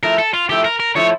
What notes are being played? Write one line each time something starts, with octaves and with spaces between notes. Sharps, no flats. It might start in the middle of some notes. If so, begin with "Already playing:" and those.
F3 A3 E4 A#4
A4
F4
F3 A3 E4 G4
A#4
A#4
F3 A3 E4 C#5